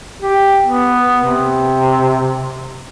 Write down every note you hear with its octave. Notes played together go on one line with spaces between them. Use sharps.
G4
B3
C3